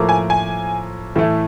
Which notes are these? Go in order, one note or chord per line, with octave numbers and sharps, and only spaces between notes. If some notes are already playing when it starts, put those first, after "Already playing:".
Already playing: A2 F3 A#3
G#5
G#5
A2 E3 A3